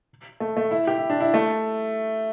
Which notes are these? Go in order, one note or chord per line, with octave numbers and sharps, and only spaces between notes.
A3
A3
E4
G4
E4
D4
E4
A3